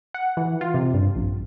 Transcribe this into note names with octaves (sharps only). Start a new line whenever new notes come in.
F#5
E3
F4
C3
G2
A#1